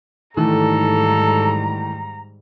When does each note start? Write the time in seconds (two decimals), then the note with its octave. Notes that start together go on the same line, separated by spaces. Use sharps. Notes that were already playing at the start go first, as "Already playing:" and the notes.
0.37 G#2 D#3 E3 G3 A3 A4 A#5